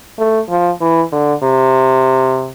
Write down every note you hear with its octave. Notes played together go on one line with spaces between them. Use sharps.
A3
F3
E3
D3
C3